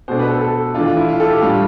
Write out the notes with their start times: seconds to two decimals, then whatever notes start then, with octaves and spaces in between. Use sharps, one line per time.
0.08 B2 A3 D4 C5
0.19 B4
0.30 A4
0.41 A4
0.74 E3 A3 D4 F4
0.86 F4
0.97 E4
1.09 F4
1.20 A4
1.31 G4
1.42 A2 G3 D4 F4